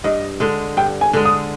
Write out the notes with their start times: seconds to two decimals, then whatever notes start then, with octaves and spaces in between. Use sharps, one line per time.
0.04 G2 D#5
0.40 D3 G#3
0.77 G2 G5
1.01 G#5
1.13 D3 G#3
1.25 D#6